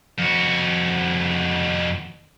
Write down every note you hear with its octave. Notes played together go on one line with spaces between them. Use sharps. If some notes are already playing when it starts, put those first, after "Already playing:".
F2 F#4